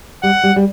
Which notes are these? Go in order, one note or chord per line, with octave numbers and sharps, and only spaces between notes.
G3 F#5
G3
G3